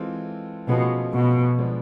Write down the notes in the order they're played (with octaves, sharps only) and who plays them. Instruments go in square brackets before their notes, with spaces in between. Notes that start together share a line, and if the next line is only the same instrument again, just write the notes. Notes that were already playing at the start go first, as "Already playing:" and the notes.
Already playing: [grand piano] E3 G#3 C4 F4 A4
[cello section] B2 [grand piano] F3 A3 C#4 F4 G#4
[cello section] B2
[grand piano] F3 G#3 B3 D4